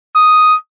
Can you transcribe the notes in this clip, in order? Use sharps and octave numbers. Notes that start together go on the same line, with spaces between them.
D#6